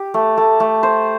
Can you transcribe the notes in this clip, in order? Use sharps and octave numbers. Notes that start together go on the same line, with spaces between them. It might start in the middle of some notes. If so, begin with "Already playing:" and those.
Already playing: G4
A3
A3
A3
C5